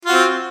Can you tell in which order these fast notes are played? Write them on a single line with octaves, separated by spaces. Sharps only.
F4 F#4 C4